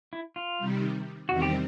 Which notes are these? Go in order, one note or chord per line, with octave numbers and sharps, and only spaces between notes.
E4
F4
C3 D#3 G3
E2 C3 D#3 G3 C4 F#4
G4